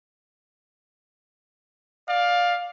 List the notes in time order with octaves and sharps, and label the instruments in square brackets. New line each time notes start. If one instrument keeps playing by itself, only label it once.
[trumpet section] D5 F5